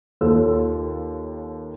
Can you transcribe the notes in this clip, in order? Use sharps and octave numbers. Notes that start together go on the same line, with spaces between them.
D#2 F4 A4 C#5 E6